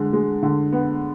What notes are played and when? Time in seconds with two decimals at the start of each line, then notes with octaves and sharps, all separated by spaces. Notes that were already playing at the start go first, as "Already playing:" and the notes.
Already playing: D3 G#3
0.13 G#3
0.43 D3
0.73 B3